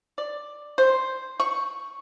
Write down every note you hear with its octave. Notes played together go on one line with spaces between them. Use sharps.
D5
C5
C#6